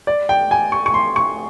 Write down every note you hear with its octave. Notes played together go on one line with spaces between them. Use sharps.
D5
G5
G#5
C#6
C#6
C6
C#6